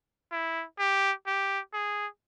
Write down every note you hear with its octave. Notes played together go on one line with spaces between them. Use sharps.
E4
G4
G4
G#4